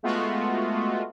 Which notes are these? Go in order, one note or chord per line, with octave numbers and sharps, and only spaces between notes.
G#3 A3 B3 F4 F#4